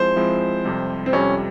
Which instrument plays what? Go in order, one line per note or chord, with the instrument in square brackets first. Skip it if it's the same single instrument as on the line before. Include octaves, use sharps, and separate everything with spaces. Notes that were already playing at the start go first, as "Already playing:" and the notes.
Already playing: [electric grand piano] F3 G#3 C4 E4 [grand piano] C5
[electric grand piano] F3 G#3 C4 E4
F2 C3 G3
[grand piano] C4
[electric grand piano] F2 C3 G3 [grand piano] C#4